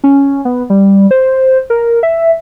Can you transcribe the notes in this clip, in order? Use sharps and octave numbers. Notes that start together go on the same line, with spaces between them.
C#4
B3
G3
C5
A#4
E5